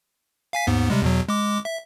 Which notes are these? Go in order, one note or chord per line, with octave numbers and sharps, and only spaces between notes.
F5 G#5 B6
D#2 G#2 B3
C3 G3 G#3
E2 B2 F#3
G#3 D6
E5